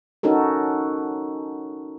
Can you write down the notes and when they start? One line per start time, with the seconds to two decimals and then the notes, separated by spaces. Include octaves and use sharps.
0.23 C#4 D#4 F#4 A4 A#4